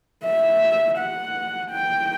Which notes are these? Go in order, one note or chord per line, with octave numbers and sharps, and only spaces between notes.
E5
F#5
G5